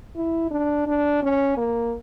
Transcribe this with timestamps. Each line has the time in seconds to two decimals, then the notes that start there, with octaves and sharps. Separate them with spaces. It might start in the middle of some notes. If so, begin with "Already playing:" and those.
0.16 E4
0.51 D4
0.87 D4
1.22 C#4
1.57 A#3